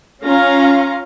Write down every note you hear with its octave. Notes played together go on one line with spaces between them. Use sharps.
C#4 F4 F5 A#5